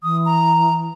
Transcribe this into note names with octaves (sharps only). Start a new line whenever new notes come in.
E3 D#6
A#5